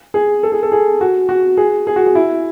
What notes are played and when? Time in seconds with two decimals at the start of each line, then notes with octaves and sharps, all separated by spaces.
0.14 G#4
0.43 A4
0.52 G#4
0.63 A4
0.72 G#4
1.01 F#4
1.29 F#4
1.57 G#4
1.87 G#4
1.96 F#4
2.06 G#4
2.15 E4